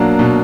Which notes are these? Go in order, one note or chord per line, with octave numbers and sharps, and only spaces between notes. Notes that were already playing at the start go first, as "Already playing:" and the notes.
Already playing: B2 F#3 A#3 D4
B2